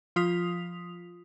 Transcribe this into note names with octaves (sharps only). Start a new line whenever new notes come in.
F3 F4 D#6 B6 F7